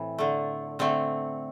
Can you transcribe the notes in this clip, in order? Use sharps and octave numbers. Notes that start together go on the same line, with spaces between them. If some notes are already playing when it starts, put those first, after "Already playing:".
Already playing: A2 E3 C4
D3 A3
D3 A3 C4